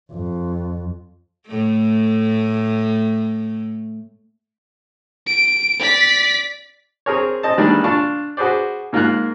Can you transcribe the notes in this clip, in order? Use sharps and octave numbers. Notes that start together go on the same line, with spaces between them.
F2
A2 A3
D7
D5 B6
C4 G#4 A#4 C#5
C4 D#5 A5
D#3 E3 G3 G#3 A#3 D4
D4 F4 A5 C#6
F#4 G#4 B4 C5 D5
G#2 A#3 F4 F5 F#6